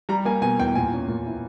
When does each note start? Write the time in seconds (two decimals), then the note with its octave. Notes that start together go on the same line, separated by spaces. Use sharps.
0.09 G3 A#5
0.25 A#3 G#5
0.42 B2 G#5
0.59 E2 G5
0.75 A#2 G#5
0.93 C#4
1.09 A#2
1.26 E4